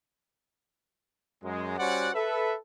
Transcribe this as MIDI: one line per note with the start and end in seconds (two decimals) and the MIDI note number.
1.44 1.76 42
1.44 1.76 56
1.79 2.10 55
1.79 2.10 61
1.79 2.10 66
1.79 2.10 72
1.79 2.10 74
1.79 2.10 78
2.15 2.54 69
2.15 2.54 71
2.15 2.54 76